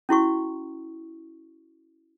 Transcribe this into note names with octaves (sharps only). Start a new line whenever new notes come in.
C#4 E4 F#4 C#6